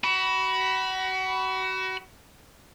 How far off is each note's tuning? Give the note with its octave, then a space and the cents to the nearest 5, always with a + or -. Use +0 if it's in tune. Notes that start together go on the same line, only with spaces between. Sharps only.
F#4 +30 B5 -5